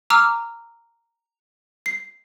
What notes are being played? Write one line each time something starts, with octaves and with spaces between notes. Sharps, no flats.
A#5 D6 E6 F6
C7